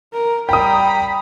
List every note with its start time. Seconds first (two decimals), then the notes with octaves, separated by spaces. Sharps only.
0.13 A#4
0.49 G3 G5 A#5 B5 D#6